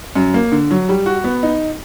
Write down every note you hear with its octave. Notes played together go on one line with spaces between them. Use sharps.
F#2
A#3
D3
F#3
G3
F#4
B3
D#4